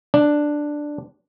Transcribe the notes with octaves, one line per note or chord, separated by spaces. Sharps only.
D4